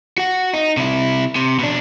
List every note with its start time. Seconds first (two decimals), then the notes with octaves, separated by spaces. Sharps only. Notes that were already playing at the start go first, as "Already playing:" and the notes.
0.18 F#4 F#5
0.53 D#4
0.77 C3 E4
1.36 C3
1.59 B2 D4